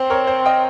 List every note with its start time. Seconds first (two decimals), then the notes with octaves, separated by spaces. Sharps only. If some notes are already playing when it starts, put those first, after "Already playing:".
Already playing: C4 C5
0.10 A#4 C#5
0.27 C5
0.46 D#5 G5